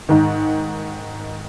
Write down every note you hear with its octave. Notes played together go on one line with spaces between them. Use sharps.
G#2 D#3